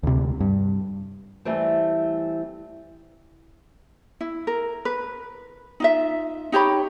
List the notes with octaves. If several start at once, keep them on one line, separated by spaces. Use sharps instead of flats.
D2 C3
G2
E3 G3 A3 C4
E4
A#4
B4
D#4 F4 E5
D#4 G4 C#5 B5